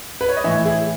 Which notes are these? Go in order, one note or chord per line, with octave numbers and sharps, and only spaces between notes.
B4
C#5
D#5
A2 E3 C#5 E5
E4 G#4